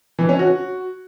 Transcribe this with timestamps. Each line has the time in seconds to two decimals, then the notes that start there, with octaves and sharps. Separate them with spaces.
0.19 E3
0.29 C#4
0.39 F#4